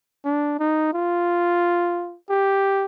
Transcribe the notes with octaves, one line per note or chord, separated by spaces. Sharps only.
D4
D#4
F4
G4